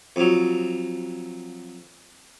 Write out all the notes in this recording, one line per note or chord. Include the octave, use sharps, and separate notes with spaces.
F2 F#3